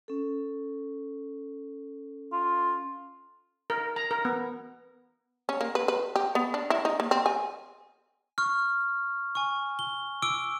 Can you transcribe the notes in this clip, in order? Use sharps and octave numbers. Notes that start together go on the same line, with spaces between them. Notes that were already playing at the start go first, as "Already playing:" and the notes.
C#4 A4
F4
A#4
A#5
A#4
B3
C#4
A#3
B4
B4
G4
B3
D4
E4
D#4
A#3
C4
G#5
C#6 F6
G#5 C#6
G7
D6 E6 D7 G7